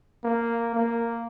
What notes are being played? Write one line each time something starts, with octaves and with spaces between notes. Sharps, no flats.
A#3
A#3